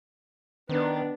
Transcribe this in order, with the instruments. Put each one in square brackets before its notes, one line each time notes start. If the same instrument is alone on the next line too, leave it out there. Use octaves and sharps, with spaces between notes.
[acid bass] D#3 [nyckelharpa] B3 D4